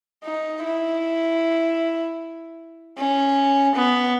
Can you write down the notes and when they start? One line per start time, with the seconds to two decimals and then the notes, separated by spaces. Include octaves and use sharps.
0.24 D#4
0.64 E4
2.98 C#4
3.75 B3